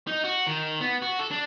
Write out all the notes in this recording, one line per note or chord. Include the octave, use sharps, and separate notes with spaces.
D#4
F#4
D#3
B3
F#4
A4
D4